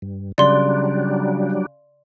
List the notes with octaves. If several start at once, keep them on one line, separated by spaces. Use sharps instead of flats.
G2
C#3 F#3 G3 D4 D5 C6